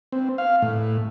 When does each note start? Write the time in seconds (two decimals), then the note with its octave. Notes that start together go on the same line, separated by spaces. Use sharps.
0.12 C4
0.38 F5
0.62 A2